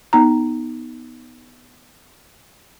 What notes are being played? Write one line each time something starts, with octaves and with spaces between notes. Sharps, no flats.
B3 D#4 A#5